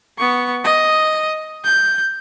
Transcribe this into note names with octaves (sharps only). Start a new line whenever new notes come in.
B3 C#6
D#5
G6